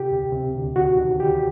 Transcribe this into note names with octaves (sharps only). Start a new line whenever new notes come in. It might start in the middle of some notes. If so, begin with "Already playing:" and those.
Already playing: C3 G4
D2
C3
D2
D2 F#4
D#3
D2 G4